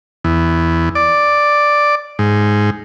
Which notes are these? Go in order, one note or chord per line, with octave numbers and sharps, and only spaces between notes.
E2
D5
G#2